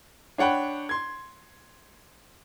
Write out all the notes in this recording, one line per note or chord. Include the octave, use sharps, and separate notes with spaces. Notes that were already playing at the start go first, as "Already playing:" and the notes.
D4 C#5 F#5 G5 B5
C6 G#6